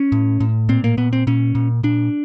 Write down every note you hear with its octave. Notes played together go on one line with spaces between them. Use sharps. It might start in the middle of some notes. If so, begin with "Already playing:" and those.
Already playing: C#4
A2
A2
A#2 C4
A#3
A#2 B3
C4
A#2 C#4
A#2
A#2 D4